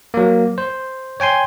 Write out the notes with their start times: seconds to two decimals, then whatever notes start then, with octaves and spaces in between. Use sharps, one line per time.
0.14 F#3 A#3
0.58 C5
1.20 C#5 G5 G#5 C6